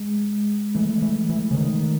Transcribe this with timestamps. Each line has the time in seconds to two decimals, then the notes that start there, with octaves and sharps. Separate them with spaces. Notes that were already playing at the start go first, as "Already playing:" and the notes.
Already playing: G#3
0.75 E3 A3
1.02 E3
1.29 E3
1.51 C#3
1.57 D#3